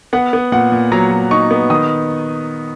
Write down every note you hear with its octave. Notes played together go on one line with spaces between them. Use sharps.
B3 F#5
B3
A#2 F#5
A#2
F#3 A#5
F#3
D#4 C#6
B3
D#3 D#6